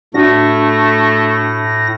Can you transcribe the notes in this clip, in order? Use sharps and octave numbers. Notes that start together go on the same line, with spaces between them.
A2 A3 D4 F#4 A#6